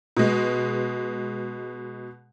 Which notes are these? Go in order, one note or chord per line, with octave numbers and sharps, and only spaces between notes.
B2 G#3